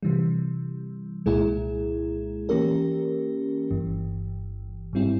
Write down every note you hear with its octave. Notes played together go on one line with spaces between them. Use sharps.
C3 E3 G3
C2 A#2 G#3 E4 G#4
E3 A#3 C#4 G4 A#4
G1 G2 E3
G#2 G3 C4 E4